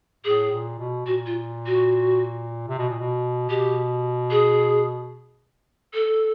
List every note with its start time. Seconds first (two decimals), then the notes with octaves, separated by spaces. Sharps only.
0.25 A2 G#4
0.52 A#2
0.79 B2
1.06 A#2 F#4
1.26 F4
1.67 F#4
2.68 C3
2.78 B2
2.89 A#2
2.99 B2
3.50 B2 G4
4.31 G#4
5.94 A4